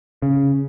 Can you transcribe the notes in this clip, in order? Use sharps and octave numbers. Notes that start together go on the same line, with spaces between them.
C#3